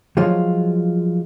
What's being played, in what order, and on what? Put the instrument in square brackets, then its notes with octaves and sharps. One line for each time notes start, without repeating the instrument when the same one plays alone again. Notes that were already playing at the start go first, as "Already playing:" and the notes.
[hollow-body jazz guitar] F3 F#3 G#3 F4